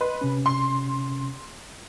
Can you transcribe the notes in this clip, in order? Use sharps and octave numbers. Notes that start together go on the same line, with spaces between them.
B4 D#5 C6
C3 C#4
C6